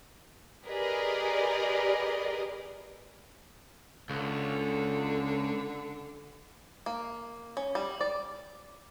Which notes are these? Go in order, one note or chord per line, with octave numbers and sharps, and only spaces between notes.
G4 G#4 A#4 B4 D5 D#5
C#2 D3
A#3
C#4
G3
D5